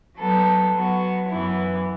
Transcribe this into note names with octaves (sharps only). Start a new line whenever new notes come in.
F#3 B3 A4
F#3 B3 F#4
F#2 E3 B3 E4